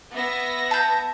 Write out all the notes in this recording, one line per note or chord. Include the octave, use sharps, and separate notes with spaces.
B3 E5 A#6
A5 G6